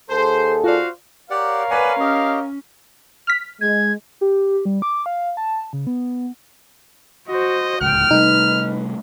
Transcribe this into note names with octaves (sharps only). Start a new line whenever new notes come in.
D#2 G#4 A4 C5
F4 F#4 C5 D5 F5
G4 A#4 C#5 D5 F5 F#5
B4 D5 F#5 G#5
C#4 G4 D#5
F6 B6
G#3 G#6
G4
G3
D6
F5
A5
C#3
B3
F#4 C5 D#5
D1 G1 C#2 G5 F6
C3 G3 A3 D#4 B4